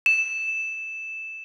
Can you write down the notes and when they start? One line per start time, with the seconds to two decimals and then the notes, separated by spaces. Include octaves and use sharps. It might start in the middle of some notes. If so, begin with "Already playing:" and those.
0.06 E7